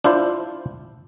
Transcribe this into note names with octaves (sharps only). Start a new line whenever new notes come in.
D4 E4 F4 C5